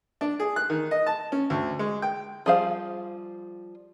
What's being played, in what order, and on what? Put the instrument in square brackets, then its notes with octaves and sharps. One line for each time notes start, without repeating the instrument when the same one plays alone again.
[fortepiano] D4
G#4
F#6
D#3
D#5
A5
C#4
D2
G#3
G5
[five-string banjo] F3 G3 G#4 C5 F5